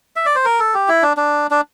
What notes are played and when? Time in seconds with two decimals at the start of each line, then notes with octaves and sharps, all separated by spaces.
0.16 E5
0.26 D5
0.35 C5
0.45 A#4
0.60 A4
0.74 G4
0.88 E4
1.03 D4
1.17 D4
1.51 D4